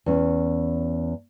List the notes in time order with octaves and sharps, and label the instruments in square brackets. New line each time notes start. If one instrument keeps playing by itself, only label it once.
[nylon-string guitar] E2 C#4